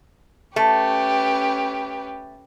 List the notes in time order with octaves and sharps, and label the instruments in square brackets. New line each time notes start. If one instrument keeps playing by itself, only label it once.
[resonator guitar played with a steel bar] A3 [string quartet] C#4 G4 B4